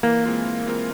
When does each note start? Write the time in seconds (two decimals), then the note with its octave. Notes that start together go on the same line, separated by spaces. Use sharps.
0.03 E3 A#3
0.24 G#3 C4 F4 A#4
0.45 E3
0.66 G#3 C4 F4 A#4